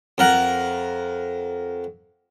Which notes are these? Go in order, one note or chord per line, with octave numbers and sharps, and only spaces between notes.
F2 A#4 F#5